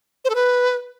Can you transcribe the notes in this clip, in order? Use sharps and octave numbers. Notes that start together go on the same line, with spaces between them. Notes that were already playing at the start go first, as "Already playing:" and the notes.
C5
A4
B4